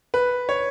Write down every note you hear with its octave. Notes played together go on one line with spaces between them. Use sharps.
B4
C#5